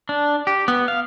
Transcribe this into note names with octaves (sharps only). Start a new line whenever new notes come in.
D4
G4
B3
F5